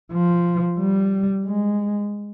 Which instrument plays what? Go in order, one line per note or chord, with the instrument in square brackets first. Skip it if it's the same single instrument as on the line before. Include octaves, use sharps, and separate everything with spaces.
[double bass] F3
G3
G#3